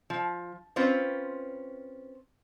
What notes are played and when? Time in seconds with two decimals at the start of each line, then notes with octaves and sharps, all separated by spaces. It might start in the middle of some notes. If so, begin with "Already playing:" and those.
0.10 F3
0.76 C4 C#4 F4 B4 C5